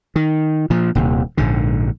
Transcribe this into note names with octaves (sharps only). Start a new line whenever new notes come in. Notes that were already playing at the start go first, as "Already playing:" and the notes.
D#3
A#2 F3
D#1 D#2 C3
A#1 G#2 D3